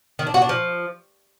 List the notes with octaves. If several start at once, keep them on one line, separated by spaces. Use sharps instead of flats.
D#3
D4
F#4
D4
F3